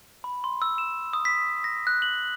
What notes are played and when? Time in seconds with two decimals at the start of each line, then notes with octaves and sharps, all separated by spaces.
0.24 B5
0.44 C6
0.62 E6
0.78 E7
1.13 D#6
1.25 B6
1.64 A#6
1.87 F#6
2.02 F#7